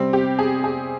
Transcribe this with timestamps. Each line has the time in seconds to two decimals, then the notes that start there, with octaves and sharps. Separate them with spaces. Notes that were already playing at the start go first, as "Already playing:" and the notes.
Already playing: C3 G3 C4
0.13 G4
0.39 G#4
0.64 G#4